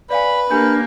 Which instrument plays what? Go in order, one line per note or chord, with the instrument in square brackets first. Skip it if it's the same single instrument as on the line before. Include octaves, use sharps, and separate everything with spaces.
[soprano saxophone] B4 [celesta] D5 F5 G#5 [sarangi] B5
[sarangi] A#3 [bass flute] D4 [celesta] G4 G#5 G6